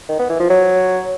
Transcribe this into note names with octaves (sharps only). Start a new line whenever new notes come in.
D#3
B3
E3
F3
F#3